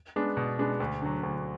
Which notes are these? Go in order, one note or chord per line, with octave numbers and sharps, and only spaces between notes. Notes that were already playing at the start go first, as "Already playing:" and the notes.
G#3 B3 D4
B2
G#3 B3 D4
D2
D3 F#3
D2